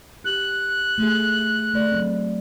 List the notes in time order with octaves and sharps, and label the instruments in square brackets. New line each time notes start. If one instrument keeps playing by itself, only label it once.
[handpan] G4 [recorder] F#6
[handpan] A3 G#4
A3 D5
F#3 C4